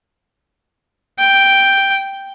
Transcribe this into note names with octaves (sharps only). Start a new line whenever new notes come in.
G5